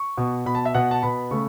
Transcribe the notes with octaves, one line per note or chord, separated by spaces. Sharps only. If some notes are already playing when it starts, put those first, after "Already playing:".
Already playing: C#6
B2 B3
B2 B3 B5
A5
E5
B2 B3 F#5
A5
B2 B3 B5
C#3 A3 C#6